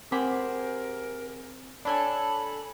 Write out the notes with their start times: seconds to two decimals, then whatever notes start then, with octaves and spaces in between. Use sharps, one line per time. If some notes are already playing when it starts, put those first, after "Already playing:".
0.12 C4 G4 G#4 A#4 C5 F#5 B5
1.85 D4 A4 C#5 D5 G#5 B5